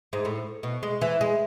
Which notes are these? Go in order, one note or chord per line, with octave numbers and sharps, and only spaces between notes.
G#2
A2
B2
G#3
E3
G#3